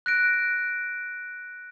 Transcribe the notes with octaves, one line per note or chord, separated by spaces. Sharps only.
F#6 A#6 D7